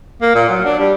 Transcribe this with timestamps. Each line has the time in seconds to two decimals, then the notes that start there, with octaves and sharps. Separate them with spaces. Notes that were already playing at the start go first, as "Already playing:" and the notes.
0.22 A#3
0.35 A#2
0.49 F#3
0.65 D4
0.79 G3